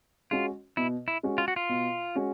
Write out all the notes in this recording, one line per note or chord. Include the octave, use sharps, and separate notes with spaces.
G#3 C#4 F4 F#4
B2 E4
E4
G#3 C#4 F#4
F4
F#4
F4
B2
G#3 C#4 F#4